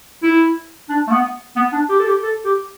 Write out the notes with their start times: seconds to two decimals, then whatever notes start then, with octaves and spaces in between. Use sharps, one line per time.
0.23 E4
0.89 D4
1.07 A3
1.11 B3
1.56 B3
1.73 D4
1.89 G4
1.99 A4
2.06 G4
2.23 A4
2.45 G4